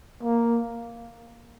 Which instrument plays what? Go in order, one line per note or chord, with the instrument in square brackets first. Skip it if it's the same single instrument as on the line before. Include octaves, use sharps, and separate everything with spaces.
[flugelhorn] A#3